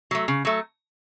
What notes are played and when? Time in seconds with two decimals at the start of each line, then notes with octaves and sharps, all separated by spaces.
0.11 F#3 A3
0.28 C#3
0.45 F#3 A3